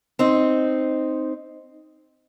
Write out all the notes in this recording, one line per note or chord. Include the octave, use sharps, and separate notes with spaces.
C4 D#4